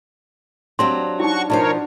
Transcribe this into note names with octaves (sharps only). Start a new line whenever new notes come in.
F#3 C4 D4 G4 F5 C6
D#4 E4 F#4 C#6
B2 F3 D4 F#4 A#4 C5 C#5